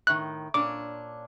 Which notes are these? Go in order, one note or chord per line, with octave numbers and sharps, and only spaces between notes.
A2 D#3 F#6
A#2 C#4 D4 D6